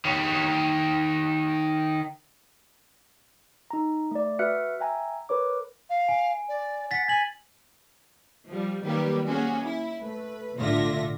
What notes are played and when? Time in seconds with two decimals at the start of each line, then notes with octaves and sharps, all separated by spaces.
0.05 D#3 C#5
3.71 D#4 A#5
4.11 A3 D5
4.39 F#4 B4 E5 F6 F#6 C#7
4.80 E5 G5 G#5 A#5
5.29 A#4 B4 C#5 D6
5.89 F5
6.09 G#5
6.48 D5
6.91 F#5 A6 B6
7.08 G#5 G#6 F#7
8.49 F3 G3
8.84 D#3 F#3 G3 A#3 G4 B4
9.27 A#3 C#4 F#4 G#4
9.65 E4
10.02 A3 B4
10.57 B1 A2 D3 F4 E5 A#6